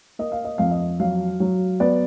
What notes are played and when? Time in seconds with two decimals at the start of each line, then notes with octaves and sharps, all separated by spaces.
0.19 A#3 D#5
0.32 F5
0.45 D#5
0.58 F2 F5
0.71 D#5
1.00 F#3 F5
1.40 F#3
1.80 B3 D5